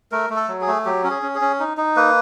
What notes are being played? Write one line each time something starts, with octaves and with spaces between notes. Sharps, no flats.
A3 A#4
A3
A4
F#3
G#4
A3
F#3 G4
C#4
G#4
C#4
G#4
C#4
D#4
D#4
A#3 B4